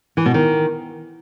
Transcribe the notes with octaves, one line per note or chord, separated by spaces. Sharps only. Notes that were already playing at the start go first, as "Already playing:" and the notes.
E3
B2
D#3